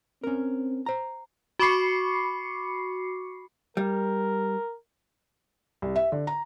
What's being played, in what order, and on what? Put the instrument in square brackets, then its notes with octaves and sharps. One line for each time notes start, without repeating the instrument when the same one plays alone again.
[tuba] C4 [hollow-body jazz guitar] C#4 A#4
[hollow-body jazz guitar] C5 A#5
[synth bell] F#4 B5 C#6 D6 C7 C#7
[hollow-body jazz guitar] G3 [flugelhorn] A#4
[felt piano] C2
E5
D3
A#5